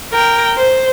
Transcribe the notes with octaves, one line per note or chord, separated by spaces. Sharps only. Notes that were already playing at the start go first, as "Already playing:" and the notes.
A#4 G5
C5